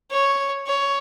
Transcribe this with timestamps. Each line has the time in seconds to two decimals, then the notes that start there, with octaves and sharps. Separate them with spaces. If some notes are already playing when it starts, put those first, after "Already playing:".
0.11 C#5
0.67 C#5